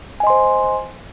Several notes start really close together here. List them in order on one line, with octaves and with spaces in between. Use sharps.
G#5 D#5 C6 C5